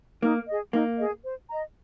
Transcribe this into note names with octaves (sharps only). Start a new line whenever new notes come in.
A#3 D#4
G#4 D#5
A#3 D#4
G#4 D#5
C5
D#5 A#5